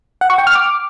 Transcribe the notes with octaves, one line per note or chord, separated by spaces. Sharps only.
F#5
C#6
G5
F6
D6